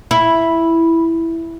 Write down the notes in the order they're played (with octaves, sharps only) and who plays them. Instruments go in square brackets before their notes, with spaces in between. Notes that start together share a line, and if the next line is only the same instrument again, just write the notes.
[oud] E4 [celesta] B5